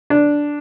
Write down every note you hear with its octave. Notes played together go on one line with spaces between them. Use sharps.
D4